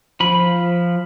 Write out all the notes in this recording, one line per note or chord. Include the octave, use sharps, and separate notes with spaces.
F3 B5